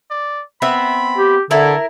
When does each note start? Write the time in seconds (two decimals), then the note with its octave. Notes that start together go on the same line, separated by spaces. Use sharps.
0.11 D5
0.62 B3 C4 E5 B5
1.18 G4
1.51 D3 E4 A4 A#4